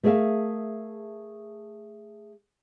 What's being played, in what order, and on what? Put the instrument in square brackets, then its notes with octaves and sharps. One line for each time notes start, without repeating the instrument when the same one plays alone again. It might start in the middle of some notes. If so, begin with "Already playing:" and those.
[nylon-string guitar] A3 G#4 A#4 D5 E5 F5